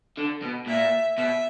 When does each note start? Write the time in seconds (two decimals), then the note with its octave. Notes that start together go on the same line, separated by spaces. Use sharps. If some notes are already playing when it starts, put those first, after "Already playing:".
0.18 D3
0.43 B2
0.67 A#2 E5
1.17 B2 E5